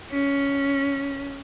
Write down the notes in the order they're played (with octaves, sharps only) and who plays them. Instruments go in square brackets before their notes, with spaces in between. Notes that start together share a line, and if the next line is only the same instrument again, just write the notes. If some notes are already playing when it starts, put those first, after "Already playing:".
[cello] C#4